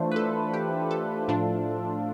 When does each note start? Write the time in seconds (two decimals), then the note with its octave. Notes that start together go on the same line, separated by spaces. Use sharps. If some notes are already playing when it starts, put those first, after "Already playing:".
Already playing: E3 A3 D4 F4 C5
0.12 B4
0.16 A4
0.54 G4
0.91 A4
1.28 A2 F3 A3 D4 F4